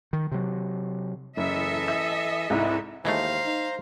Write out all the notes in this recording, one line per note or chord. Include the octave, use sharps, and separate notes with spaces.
D#3
C3 F#3
F#1 E3 A4 D#5 E5
E6
C2 G#2 E4
D#2 E3 G#3 A3 C5 F5 A#5
D#4